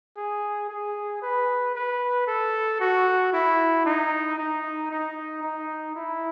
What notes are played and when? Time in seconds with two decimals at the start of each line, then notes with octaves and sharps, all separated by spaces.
0.17 G#4
0.69 G#4
1.22 B4
1.75 B4
2.27 A4
2.80 F#4
3.33 E4
3.85 D#4
4.38 D#4
4.91 D#4
5.43 D#4
5.96 E4